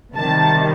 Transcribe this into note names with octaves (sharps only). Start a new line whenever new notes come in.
C3 D#3 G3 A5